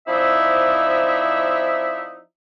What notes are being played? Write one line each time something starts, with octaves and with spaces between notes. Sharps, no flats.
F3 C4 D#4 E4 D5 E5